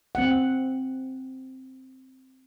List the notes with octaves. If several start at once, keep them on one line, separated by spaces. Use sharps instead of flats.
C4 F#5